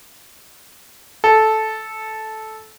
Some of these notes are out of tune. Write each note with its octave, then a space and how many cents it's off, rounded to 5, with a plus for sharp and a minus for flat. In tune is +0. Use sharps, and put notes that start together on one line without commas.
A4 -10